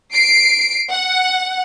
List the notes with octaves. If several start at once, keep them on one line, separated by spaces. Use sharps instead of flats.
C7 D7
F#5